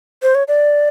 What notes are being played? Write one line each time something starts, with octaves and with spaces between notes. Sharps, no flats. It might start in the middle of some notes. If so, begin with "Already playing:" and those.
C5
C#5
D5